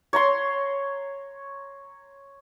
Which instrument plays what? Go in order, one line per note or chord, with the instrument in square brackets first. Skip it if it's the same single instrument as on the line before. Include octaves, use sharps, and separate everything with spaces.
[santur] C#5 A#5 C6